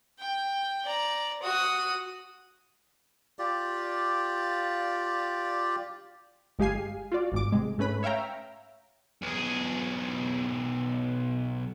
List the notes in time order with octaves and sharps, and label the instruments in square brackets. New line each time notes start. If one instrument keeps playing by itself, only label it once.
[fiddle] G5
D5 A#5
F#4 D#6
[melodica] F4 G4 D5
[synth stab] G1 G#3 G4 F5 G#5 C7
F4 F#4 D5
G#1 G#2 D6
C3 G#3
G#2 A3 C#4 B4 B5
C#5 E5 F5 G5 A#5
[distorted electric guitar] B1 G#4